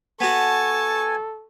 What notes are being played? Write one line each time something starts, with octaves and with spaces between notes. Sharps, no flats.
B3 F#4 A4 G#5 A5 C#6